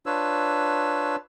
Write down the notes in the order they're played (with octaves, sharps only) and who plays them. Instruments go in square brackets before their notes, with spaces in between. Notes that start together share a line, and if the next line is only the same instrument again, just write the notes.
[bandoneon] D4 F4 B4 C#5 E6